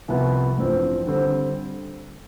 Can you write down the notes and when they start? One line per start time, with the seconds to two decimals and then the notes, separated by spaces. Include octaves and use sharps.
0.08 C2 C3 F3 B3 F4
0.58 A1 G2 F3 C4
1.07 D3 G3 C4